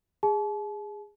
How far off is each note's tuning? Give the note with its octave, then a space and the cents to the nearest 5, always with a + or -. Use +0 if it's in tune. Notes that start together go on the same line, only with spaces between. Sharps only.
G#4 -15 A5 -45